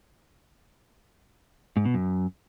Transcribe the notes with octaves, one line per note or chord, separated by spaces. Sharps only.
G#2
B2
F#2